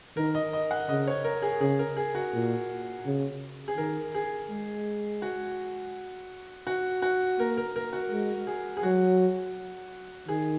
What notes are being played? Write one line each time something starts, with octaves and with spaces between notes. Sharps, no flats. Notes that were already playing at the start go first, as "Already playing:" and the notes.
D#3 A#4
D#5
D#5
F#5
C#3 D#5
C#5
A#4
G#4
C#3 G#4
A#4
G#4
F#4
A#2
C#3
G#4
D#3 A#4
G#4
G#3
F#4
F#4
F#4
A#3 A#4
A#4
A#4
F#4
G#3
G#4
G#4
F#3 F#4
D#3 G#4